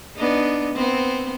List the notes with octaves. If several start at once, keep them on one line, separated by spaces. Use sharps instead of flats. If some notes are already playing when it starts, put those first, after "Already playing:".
B3 D4 D#4
B3 C4